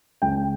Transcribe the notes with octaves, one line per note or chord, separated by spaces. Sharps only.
C#2 G5